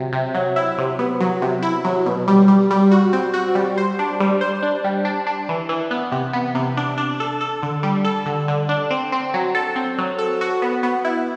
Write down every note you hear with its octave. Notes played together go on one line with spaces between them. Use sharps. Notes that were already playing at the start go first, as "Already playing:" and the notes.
Already playing: C3 F#3
C3
F#3
E4
C3
B3
F#3
C3
E4
F#3
B2
G3
G3
G3
F#4
C4
F#4
G3
C5
D4
G3
C5
D4
G3
D4
D4
E3
E3
B3
C3
B3
C3
D4
D4
A4
A4
D3
G3
A4
D3
D3
D4
C4
C4
F#3
A4
C4
F#3
A4
F#4
B3
B3
E4